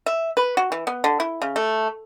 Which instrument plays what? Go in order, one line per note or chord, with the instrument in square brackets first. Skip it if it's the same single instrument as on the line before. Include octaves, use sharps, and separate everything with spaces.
[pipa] E5
B4
F#4
E3
B3
D3
E4
C#3
A3